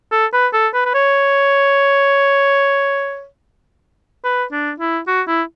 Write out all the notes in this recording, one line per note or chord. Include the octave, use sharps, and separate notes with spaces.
A4
B4
A4
B4
B4
C#5
B4
D4
E4
F#4
E4